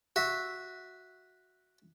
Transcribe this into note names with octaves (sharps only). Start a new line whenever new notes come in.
F#4 E5